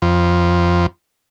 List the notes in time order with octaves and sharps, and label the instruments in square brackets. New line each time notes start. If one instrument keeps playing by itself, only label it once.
[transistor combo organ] F2